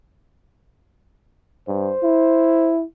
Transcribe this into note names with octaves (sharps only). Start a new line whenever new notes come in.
G2 C5
E4